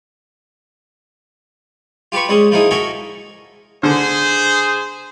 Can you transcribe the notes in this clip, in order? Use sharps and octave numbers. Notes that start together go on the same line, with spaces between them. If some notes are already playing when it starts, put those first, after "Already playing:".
F4 G4 B4 B5 C#6
G3 G#3 C#4 G#4
F3 A#3 D#4 E4 G#4
F#4 A4 A#4 E5 G#5 D#6
D3 G#4 C5